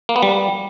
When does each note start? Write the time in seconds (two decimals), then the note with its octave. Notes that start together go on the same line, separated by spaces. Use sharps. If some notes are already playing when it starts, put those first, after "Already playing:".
0.09 A#3
0.16 B3
0.23 G3